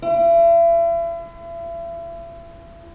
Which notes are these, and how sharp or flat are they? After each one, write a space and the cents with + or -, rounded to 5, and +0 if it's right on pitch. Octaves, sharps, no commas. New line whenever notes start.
E4 +40